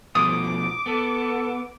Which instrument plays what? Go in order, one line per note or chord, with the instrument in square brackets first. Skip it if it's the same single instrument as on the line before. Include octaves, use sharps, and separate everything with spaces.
[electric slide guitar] B2 F3 A3 [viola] D6 [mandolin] D#6
[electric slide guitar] B3 [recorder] A4